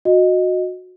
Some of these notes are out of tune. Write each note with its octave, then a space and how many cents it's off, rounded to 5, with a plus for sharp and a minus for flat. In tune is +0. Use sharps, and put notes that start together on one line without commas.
F#4 -20 D#5 +0